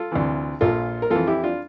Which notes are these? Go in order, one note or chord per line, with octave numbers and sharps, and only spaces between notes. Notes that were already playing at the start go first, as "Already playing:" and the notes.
Already playing: F4 A4
D2 C3 E3
A#1 A#2 F4 A4
A#4
F2 E3 F4 A4
E4 G4
D4 F4